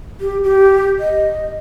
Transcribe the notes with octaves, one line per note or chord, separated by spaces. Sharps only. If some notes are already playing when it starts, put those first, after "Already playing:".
G4
G4
D#5